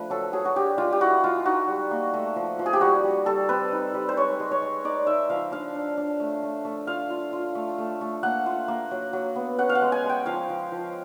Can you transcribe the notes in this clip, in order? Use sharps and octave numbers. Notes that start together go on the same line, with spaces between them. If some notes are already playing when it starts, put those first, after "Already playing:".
Already playing: F3 A3 D4 B4
F#3 A4
F#3 G#4
F#4
D4 G4
G#3 F4
G4
E4 F#4
G#3 F4
D#4 F#4
G3
A#3
A3
F3
F3
G#4
G4
G3 F#4
G3
G3 A4
C4 B4
D#4
G3
C5
G#3 C#5
G#3
C#5
G#3
D#4 D5
D#4 E5
F3 F5
D4 F5
D4
D4
A3
A3
A3
F4 F5
F4
F4
A3
A3
A3
A#3 F#5
F4
A#3
F#3
F#3
B3
C#4 F#5
F5
F#5
G#3
G#5
G#3
G5
F3 F5
F3
F3